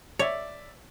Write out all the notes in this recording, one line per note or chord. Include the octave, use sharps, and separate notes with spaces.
C#5 D5 E5